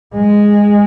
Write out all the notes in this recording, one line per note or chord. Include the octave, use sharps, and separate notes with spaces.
G#3